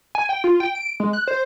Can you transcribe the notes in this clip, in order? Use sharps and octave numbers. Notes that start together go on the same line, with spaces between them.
G#5
G5
F4
G5
D7
G#3
F#6
C5